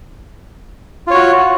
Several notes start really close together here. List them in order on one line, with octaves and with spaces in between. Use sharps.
F4 C#5 F#4